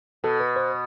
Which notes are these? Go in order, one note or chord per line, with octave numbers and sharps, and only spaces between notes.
B2 A4
B4
C5